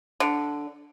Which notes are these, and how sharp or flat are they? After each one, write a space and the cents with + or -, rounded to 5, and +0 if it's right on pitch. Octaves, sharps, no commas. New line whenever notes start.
D3 -5